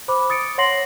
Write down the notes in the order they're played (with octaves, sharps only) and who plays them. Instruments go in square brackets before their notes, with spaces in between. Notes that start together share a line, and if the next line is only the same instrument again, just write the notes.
[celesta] C5 B5 D6
D#6 A6 C#7 D7
C#5 F#5 C6 A#6 C7 F#7